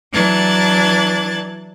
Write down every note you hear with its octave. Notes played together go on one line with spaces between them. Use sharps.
E3 F#3 D4 F#6 G#6 A6